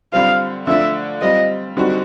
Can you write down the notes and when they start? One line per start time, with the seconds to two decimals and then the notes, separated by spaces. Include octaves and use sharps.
0.12 D3 G3 C4 F4 F5
0.66 D3 F3 A3 D4 E5
1.21 G3 C4 F4 D#5
1.77 D3 G3 C4 D#4 F#4